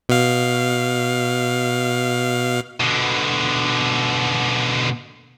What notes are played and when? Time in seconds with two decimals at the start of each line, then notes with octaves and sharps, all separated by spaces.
0.09 B2 F5
2.80 B2 D3